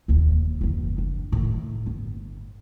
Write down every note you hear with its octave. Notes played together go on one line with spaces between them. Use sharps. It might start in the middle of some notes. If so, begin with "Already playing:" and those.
E1 D#2
F#1 E2
D4
A2 D#3
G1